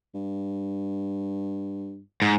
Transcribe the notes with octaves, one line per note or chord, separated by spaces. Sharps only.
G2
G#2